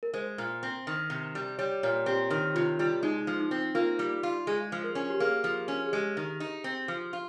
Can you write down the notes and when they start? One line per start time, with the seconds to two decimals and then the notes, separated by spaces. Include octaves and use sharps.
0.03 A#4
0.14 G#3 C5
0.38 A#2
0.63 C4
0.87 D#3
1.10 C3
1.35 G3
1.59 G3 C#5
1.83 A#2 C#5
2.06 C4 G4
2.30 D#3
2.55 C3 F4
2.79 G3 F4
3.03 G#3 D#4
3.27 F3
3.39 D#4
3.51 C4
3.75 A#3 F4
3.99 G3
4.23 F4
4.47 G#3 G#4
4.72 F3
4.84 A#4
4.95 C#4
5.10 G4
5.20 A#3 G#4
5.44 F3
5.68 C#4
5.86 G#4
5.93 G#3 G4
6.17 D#3
6.40 D#4
6.64 C4
6.88 F3
7.13 F4